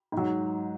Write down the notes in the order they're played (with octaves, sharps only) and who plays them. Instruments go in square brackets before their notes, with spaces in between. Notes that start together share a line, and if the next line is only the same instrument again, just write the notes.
[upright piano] G#2 F#3